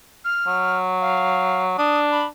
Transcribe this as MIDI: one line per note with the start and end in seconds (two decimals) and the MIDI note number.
0.25 0.78 89
0.47 1.76 54
1.01 1.63 77
1.78 2.26 62
1.78 1.99 87
2.12 2.26 83